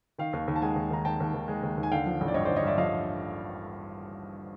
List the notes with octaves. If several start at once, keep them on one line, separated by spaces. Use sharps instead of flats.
D#3 F5 G5
D#2
D#2
A5
G#3 F#5 G#5
D#2
D#3 A#5
D#2 G5 A5
D#2
D#3
G#3
D#2
D#2
G#5
D3 F5 G5
F3
A1
D5
G2 C#5 D#5
C5 D5
D3
C#5 D#5
G2 D5 E5
F3 D#5 F5